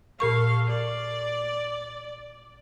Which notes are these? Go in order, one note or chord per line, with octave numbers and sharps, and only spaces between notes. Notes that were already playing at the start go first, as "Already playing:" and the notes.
A#2 A4 A#4 F5 C#6
D5